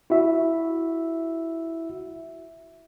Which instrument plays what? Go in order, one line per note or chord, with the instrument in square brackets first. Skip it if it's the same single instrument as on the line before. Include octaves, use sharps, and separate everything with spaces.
[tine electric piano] E4 F#4 E5